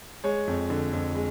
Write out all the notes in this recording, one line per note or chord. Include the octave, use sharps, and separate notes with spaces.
G#3 C#5
F2
D3
F2
G#3